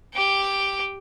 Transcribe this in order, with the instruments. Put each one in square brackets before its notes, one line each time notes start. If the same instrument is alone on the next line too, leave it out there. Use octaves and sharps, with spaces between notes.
[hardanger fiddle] G4 G5